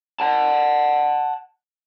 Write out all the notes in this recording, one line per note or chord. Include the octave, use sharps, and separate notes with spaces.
F#5 A5